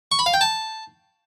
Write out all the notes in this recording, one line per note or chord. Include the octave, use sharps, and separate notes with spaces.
C#6
B5
F5
G5
A5